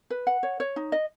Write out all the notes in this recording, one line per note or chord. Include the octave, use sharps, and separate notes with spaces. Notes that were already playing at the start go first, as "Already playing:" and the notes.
B4
F#5
C#5
C#5
D#4
D#5